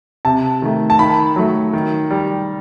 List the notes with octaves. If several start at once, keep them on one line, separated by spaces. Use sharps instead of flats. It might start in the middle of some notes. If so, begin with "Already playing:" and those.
C3 A5
D#3 A3
A5
D#3 B5
F#3 A3
D#3
G3